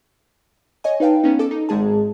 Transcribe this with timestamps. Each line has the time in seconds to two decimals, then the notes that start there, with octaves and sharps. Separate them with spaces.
0.84 C#5 D#5 G#5
1.00 D#4 B4 F5 G5 A5
1.24 B3 C#4 D#4
1.39 A4 D6
1.51 D#4
1.69 G#1 G#2 G#3 G#4 A5